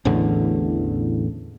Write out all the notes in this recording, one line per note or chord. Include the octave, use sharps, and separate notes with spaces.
A1 E2 A2 D3